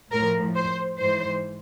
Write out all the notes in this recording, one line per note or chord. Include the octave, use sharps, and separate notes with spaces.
A2 F3 A#4
C5
G#2 E3 C5